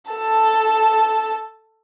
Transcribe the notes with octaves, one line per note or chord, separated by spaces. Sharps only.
A4 A5